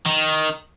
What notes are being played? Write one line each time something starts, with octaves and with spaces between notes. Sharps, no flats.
D#3